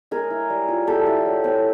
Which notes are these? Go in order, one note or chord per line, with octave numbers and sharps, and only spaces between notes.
G#3 G#4 A#4
E4
G3
F4
G#3 G4 A4
E4
F#3
C4